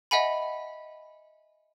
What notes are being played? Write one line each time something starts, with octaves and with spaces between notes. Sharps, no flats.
D#5 E5 F#5 G#5 B5